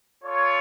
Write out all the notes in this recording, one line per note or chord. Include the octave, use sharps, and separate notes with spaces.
F4 A4 C#5